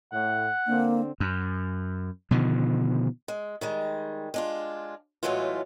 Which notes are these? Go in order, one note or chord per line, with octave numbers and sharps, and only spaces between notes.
A2 F#5
D3 A#3 C4 D4
F#2
B2 D3 D#3 F3
G#3
D#3 G3 G#3
G#3 D4 F4
A2 E3 F#3 G#3 A3 F4